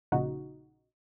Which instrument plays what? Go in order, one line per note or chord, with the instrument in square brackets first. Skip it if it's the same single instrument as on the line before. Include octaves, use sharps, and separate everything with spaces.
[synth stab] A#1 A#2 C#3 D#4 F#4